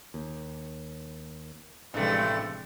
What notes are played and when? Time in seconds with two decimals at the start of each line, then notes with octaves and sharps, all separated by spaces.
0.14 D#2
1.94 A1 G2 C3 F3 G#3 A3